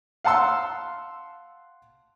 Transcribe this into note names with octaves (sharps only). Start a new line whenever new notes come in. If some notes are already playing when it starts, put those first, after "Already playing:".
F5 F#5 A5 C6 E6